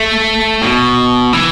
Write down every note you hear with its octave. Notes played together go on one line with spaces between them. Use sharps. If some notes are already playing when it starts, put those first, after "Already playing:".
Already playing: A3
B2
E3